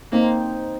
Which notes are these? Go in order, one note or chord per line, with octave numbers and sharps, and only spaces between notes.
A#3 C4 D#4